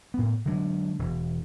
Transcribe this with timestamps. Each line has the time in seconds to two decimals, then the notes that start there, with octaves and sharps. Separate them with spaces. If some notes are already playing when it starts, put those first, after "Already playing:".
0.14 A2 B3
0.45 D3 F#3 G#3 D4
0.99 E1